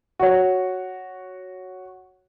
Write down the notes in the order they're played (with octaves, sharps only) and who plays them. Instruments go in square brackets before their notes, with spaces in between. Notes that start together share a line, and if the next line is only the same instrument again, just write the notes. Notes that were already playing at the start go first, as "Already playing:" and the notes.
[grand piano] F#4 C#5